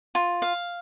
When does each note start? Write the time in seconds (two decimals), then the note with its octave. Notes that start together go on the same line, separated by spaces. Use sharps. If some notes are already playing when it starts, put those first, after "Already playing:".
0.15 F4
0.42 F5